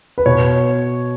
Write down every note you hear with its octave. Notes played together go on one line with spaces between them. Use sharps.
B4
B2 C#5